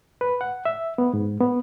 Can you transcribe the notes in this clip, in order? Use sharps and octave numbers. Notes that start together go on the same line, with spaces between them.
B4
F#5
E5
B3
G#2
B3